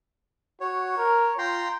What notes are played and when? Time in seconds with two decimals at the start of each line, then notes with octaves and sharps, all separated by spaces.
0.61 F#4 C#5
0.97 A#4
1.38 F4 G5 A#5 C6